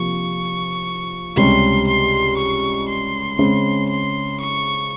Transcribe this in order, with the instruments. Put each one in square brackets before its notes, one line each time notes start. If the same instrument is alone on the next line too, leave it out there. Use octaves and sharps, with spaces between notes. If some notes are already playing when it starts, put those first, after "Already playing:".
Already playing: [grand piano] C3 F3 A#3 [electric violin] C#6
[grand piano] C#2 C3 G3 C#4 [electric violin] C6
[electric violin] C6
C#6
C6
[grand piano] C#3 G#3 C4
[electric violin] C6
C#6